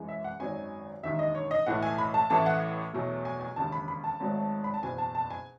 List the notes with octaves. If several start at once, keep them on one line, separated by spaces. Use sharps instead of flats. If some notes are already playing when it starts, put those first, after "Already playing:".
Already playing: F#2 E3 G#3
E5
F#5
G#1 F#2 D#3 F#3 G#5
E1 D#2 D#3 E5
D#5
C#5
D#5
B1 A2 E3 A3 F#5
G#5
B5
A5
A1 A2 E3 A3 A5
F#5
E2 B2 F#3 A3
G#5
G#5
E1 D#2 C#3 A5
B5
B5
A5
G#1 G#2 F#3 A3
B5
A5
F#1 E2 B2 G#5
A5
A5
G#5